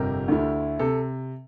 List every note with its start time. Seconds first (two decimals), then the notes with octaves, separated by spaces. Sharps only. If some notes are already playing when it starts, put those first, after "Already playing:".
Already playing: G1 F2 C3 G4 A#4
0.28 D2 D3 A3 E4
0.79 C3 A4